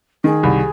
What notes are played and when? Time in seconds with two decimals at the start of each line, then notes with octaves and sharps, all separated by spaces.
0.24 D#3 G#4
0.43 C2